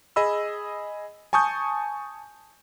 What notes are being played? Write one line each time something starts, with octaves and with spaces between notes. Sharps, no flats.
G#4 D#5 B5 E6
G#5 A5 C#6 D#6 G6